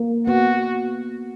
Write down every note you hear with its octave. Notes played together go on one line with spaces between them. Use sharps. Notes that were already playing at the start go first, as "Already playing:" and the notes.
Already playing: A#3
B3 F#4